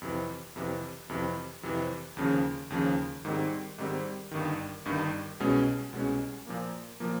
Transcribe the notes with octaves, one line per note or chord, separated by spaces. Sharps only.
F2 C3 E3
F2 C3 E3
F2 C3 E3
F2 C3 E3
D#2 C#3 F3
D#2 C#3 F3
G#2 D#3 G3 C4
G#2 D#3 G3 C4
G1 G2 D#3
G1 G2 D#3
C2 B2 G#3 C#4
C2 B2 G#3 C#4
A#2 F3 A#3
A#2 F3 A#3